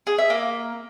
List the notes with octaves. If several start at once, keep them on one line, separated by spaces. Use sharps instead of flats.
G#4
E5
A#3